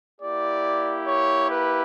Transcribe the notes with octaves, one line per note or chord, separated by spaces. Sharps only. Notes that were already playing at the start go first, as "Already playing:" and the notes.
A#3 E4 G4 D5
C#5
B4